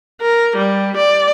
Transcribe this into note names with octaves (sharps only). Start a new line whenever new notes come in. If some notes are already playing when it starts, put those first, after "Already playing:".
A#4
G3
D5